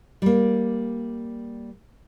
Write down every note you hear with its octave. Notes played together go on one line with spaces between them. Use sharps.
G3 A#3